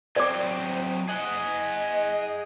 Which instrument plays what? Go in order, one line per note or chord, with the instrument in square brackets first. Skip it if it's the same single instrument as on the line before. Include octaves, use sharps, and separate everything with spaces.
[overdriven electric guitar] F#3 C4 [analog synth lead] C5 [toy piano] D5 D6
[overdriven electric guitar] G#4 F#5 [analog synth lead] D#5